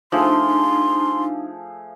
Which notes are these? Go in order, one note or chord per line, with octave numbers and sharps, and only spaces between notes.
F3 A3 D4 D#4 G#4 C6